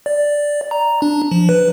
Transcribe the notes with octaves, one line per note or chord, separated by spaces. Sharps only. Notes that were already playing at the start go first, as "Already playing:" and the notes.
D5
A#5
D4
F3
B4